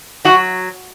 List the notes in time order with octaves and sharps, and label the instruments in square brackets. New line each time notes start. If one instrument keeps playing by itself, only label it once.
[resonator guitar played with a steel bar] F#3 F#4